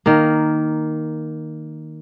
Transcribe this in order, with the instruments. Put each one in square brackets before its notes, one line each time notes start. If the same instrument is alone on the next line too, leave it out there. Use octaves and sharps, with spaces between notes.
[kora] D#3 A#3